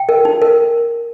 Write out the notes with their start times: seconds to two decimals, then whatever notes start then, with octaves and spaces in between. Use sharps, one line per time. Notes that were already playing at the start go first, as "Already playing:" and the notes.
Already playing: G5
0.09 A#4
0.25 D#4
0.42 A#4